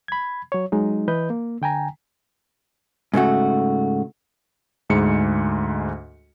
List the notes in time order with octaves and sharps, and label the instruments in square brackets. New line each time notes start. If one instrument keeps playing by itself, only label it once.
[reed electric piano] B5 G#6
F#3 C#5
F#3 G#3 D#4
E3 B4 D#5 G6
A#3
D3 G5 G#5 A#5
[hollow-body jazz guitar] G#2 C#3 A3 F#4
[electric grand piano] D2 G#2 G#3 C#7